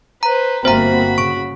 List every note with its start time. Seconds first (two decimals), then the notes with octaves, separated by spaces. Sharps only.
0.23 B4 C5 A#5
0.65 G1 A#3 C4 F#4 C5 E5 A#5 B5
1.18 C#3 C#6 D7